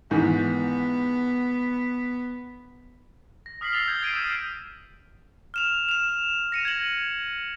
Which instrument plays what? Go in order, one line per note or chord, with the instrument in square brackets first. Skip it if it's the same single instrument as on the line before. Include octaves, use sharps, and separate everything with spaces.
[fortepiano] G#2 D#3 E3 [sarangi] B3
[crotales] A#6
D#6 F6 B6 C7 F#7
E6 F6 A6 C7 F7 G7
G6 G#6 G7
E6 G#6 A6 C7 D7 D#7
D#6 E6 G6 A6 D#7 E7
F6 E7 F7
E7 F7
A#6 C#7 D#7
G#6 F#7